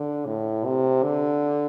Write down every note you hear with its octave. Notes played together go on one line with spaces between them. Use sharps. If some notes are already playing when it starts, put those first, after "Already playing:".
Already playing: D3
A2
C3
D3